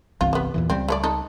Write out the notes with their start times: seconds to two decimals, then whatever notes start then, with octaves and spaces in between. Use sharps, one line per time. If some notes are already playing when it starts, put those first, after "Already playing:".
0.21 G1 C2 E3 F4
0.33 G3 B3
0.54 E2 A#2 E3
0.70 C#2 G3 C4
0.88 A3 C#5 D5
1.04 D#4 A4